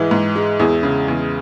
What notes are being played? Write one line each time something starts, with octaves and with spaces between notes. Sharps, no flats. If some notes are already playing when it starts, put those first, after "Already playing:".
Already playing: G#2 E3 E4 G#4
G#2
G#3
E2 E4 G#4
C#3
E2